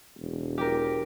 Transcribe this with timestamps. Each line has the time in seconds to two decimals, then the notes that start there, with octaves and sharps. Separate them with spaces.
0.19 E1
0.58 G4 A#4